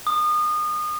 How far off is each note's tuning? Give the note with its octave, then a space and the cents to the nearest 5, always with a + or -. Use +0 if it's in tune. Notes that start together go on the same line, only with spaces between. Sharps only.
D#6 -30